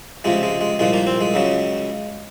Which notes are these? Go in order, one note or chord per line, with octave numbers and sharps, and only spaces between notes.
C#2 C3 F3 G#3
G#3
G#3
C2 A#2 F3 G#3
A#3
C4
G#3
C#2 C#3 F#3